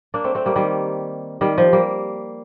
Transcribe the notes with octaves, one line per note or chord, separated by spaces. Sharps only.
A#3 D4
A3 C4
A3 C4
G3 A#3
D#3 G3
D#3 G3
F3
G3 A#3